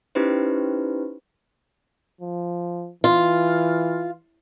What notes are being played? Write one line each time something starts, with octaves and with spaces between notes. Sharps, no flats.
C#4 D#4 E4 G4 B4 C5
F3
E3 F4